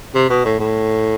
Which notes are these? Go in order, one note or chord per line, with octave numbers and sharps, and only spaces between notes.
C3
B2
A2
A2